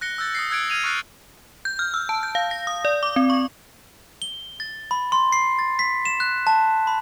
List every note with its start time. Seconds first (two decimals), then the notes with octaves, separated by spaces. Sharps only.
0.01 F#6 A#6 C#7 G7
0.18 E6 F#6 G6 A6
0.35 D#6 A#6 C7
0.51 E6 F#6 G#6 C#7 D7
0.70 F6 G#6 D#7 F7
0.84 C#6 D#6 F6 F#6 A6 C7
1.65 G6
1.79 F6
1.94 E6
2.09 A5
2.23 G6
2.35 F5
2.51 A#6
2.67 D#6
2.85 D5
3.03 D6
3.16 C4
3.30 C#6
4.22 G7
4.60 A6
4.91 B5
5.12 C6
5.33 C7
5.59 A6
5.79 B6
6.05 E7
6.20 F#6
6.47 A5
6.87 B5